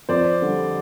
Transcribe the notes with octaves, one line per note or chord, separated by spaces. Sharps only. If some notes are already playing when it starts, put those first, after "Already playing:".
F2 C5 D5
D3 G3